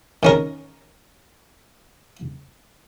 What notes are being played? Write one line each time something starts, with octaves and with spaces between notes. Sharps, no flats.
D#3 C#4 A#4